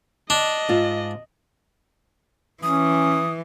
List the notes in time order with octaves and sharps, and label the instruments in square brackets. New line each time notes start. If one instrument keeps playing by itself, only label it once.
[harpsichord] D4 [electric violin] D#5
[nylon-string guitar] G#2 F4
[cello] E3 [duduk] C#4 [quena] D#6